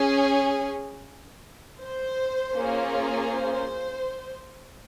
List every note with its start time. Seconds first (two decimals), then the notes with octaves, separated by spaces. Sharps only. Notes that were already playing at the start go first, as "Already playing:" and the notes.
Already playing: C#4 G#4
1.82 C5
2.55 A#3 C#4 F4 G#4
3.28 C5